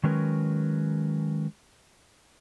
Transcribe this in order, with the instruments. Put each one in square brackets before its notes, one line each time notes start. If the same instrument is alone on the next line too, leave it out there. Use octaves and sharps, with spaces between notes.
[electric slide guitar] D#3 F#3 G#3 C#4 A#4 B4